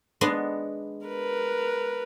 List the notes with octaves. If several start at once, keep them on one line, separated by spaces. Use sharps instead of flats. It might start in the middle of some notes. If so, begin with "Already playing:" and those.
G#3 B3 D4
A#4 B4